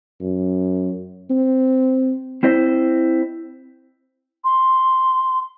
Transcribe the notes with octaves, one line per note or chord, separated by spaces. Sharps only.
F#2
C4
C4 E4 C5 D#5
C6